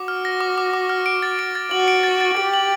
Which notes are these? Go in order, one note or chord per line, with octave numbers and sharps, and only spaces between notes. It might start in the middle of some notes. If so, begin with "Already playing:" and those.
Already playing: F#4 D6
F6
A#6
D6
D6
D6
F6
D7
A6
D7
A6
F#4 F#7
D7
A6
A6
G4 D7
F#7